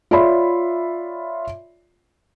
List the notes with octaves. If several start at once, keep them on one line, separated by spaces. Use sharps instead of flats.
F4 C#5 D5 E5 B5 C6